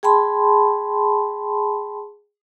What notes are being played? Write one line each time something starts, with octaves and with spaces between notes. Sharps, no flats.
G#4 G5 A5 B5 C6